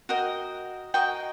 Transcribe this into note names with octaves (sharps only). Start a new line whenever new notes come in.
F#4 A#4 D#5 G5
F#4 A#4 D#5 G5